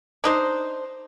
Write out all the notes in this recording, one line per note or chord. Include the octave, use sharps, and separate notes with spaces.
D4 D#4 C5